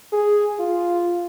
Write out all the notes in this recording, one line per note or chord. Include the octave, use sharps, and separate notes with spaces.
G#4
F4